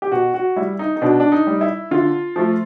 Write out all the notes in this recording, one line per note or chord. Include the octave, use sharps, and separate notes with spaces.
G4
B2 F#4
F#4
G3 E4
D#4
D#4
B2 D4
D4
D#4
G3
E4
D3 F4
F3 A3